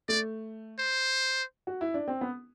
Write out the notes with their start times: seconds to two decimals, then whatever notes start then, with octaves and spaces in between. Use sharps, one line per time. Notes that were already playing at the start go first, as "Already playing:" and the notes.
0.09 A3 D5
0.79 C5
1.67 F#4
1.81 E4
1.94 D4
2.08 C4
2.21 B3